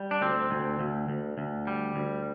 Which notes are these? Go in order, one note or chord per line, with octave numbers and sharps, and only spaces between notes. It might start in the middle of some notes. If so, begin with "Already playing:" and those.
Already playing: G3
D4
D2 C4
D2
D2
D2
D2
G3
D2